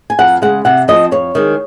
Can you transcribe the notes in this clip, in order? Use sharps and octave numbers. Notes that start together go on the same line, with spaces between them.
G#5
F2 F#5
C#3 G#3 F#5
C3 F#5
F3 C4 D#5
F2 C#5
D#3 G#3